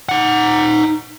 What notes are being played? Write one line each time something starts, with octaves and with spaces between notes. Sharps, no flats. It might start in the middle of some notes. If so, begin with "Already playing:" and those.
D#4 F#5